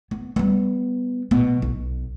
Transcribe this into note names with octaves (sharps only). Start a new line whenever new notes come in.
B3
G3 B3
B2
B1